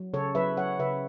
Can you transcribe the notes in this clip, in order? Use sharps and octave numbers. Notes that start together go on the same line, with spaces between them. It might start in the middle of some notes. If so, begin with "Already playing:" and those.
Already playing: F#3
C#3 A4 C#5
F#3 B4 E5
F#3 C#5 F#5
C#3 B4 E5